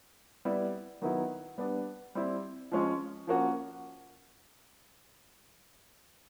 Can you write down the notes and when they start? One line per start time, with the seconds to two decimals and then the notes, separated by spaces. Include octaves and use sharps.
0.45 G3 B3 E4
1.02 D#3 F#3 B3 E4
1.58 G3 B3 D4
2.15 G3 C4 E4
2.72 F3 G#3 C#4 F4
3.27 F3 A#3 C#4 F#4